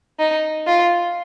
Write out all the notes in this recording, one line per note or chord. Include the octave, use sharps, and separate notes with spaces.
D#4
F4